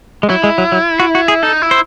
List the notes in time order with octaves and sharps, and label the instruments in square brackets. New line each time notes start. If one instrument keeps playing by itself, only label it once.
[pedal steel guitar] G#3
[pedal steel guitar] F#3 [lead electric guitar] E4
[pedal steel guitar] G#3
F#3
F#3
F#4
F#4
G#4
[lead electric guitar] D#4 [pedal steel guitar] A4
[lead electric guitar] E4
[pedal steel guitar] C5